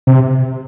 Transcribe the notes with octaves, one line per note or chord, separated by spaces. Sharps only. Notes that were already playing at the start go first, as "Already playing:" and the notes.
C3